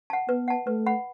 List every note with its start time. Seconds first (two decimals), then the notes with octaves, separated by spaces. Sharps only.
0.10 F#5 A5
0.29 B3 B4
0.48 F#5 A5
0.67 A3 B4
0.87 F#5 B5